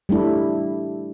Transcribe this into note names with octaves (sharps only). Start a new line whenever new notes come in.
G3 A3 D4 E4